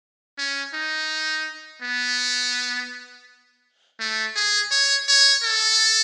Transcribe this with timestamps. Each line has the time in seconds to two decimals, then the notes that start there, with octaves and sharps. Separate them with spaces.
0.38 C#4
0.74 D#4
1.82 B3
4.00 A3
4.36 G#4
4.71 C#5
5.08 C#5
5.44 A4